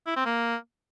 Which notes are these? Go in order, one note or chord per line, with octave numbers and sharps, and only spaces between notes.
E4
C4
A#3